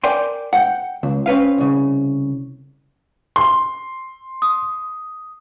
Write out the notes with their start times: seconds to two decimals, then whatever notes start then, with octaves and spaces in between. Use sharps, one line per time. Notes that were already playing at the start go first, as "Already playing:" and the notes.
0.04 A#4 D5 G5 G#5 C6
0.53 F#5 G5
1.03 C#2
1.26 C4 C#4 B4 F5
1.58 C2 C#3
3.36 C6
4.42 D#6